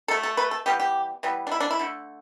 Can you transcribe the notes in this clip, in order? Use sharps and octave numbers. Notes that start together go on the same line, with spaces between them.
B2 A3 A4
A4
B4
A4
E3 G3 B3 G4
G4
E3 G3 B3
D4
E4
D4
E4
D3 A3